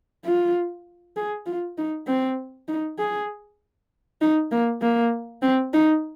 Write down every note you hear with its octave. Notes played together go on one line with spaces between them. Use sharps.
F4
G#4
F4
D#4
C4
D#4
G#4
D#4
A#3
A#3
C4
D#4